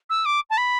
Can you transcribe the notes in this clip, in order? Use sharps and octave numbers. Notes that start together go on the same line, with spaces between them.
E6
D6
A5
B5